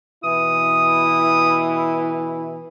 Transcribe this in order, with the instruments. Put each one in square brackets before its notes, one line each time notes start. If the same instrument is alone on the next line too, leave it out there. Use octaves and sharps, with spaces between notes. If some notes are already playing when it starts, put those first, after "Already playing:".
[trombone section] B2 E3 E4 [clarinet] D#6